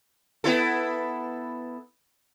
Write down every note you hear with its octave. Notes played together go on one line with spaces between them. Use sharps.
B3 E4 A4